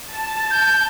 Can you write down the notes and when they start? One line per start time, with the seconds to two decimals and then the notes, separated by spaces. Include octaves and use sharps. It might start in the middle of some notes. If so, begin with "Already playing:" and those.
0.12 A5
0.51 G6